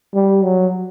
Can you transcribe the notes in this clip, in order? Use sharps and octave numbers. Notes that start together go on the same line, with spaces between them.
G3
F#3